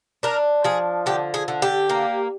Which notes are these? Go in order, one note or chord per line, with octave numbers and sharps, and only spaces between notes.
D4 A#4
F3 G#4
D3 G4
G#4
D3
G4
A#3